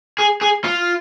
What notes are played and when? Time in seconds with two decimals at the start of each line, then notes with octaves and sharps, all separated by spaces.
0.19 G#4
0.41 G#4
0.64 F4